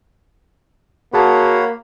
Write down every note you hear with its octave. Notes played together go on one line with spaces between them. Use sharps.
A#3 F#4 G#4 C#5 F#5 A5 B5